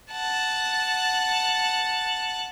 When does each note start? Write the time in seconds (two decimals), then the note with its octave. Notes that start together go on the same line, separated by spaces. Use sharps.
0.12 F#5 A5